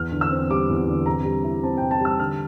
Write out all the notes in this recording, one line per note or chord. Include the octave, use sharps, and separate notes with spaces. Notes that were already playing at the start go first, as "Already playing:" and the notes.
Already playing: E2 F6
D3
E6
C4
G3 D6
E2
D3
C3 A#5
G3
E4
C4 A5
C3 G5
A5
G3 E6
D3 F6